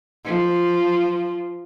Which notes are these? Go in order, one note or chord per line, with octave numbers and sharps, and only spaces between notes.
F3